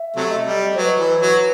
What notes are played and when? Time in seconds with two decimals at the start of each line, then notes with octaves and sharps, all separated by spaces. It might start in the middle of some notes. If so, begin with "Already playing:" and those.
Already playing: E5
0.17 C3 F#3 A3
0.31 D#5
0.46 G3
0.76 F#3 B4 C5
0.99 E3
1.21 F#3